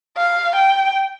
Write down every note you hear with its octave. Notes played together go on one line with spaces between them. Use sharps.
F5
G5